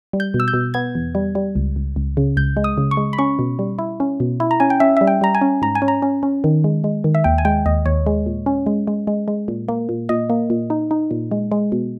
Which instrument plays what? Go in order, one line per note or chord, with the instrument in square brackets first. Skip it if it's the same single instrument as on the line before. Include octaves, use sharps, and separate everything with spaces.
[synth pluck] G3
G6
B2
E6
G6
B2
B3 G#6
E2
G3
G3
C#2
C#2
C#2
C#3
C#2 G6
G#3
D#6
C#3
C#6
G#3
B5
C#4 C#6
B2
G3
E4
C#4
B2
E4
A#5
C#4 G#5
G5
C#4 E5
G3 E5
G5
G3 A#5
G#5
C#4
G#2 A#5
G#5
C#4
A#5
C#4
C#4
D#3
G#3
G#3
D#3
E5
D#2 G5
G#5
G#3 G5
D#2 D#5
D#2 C#5
G#3
A#2
C#4
G#3
G#3
G#3
G#3
A#2
A#3
A#2
A#2 D#5
A#3
A#2
D#4
D#4
A#2
G#3
G#3
B2